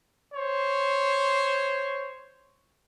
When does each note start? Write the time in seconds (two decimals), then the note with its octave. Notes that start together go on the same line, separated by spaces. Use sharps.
0.35 C5 C#5